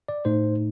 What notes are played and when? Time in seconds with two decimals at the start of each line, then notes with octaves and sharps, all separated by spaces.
0.08 D5
0.25 A2 A3 D#4 C5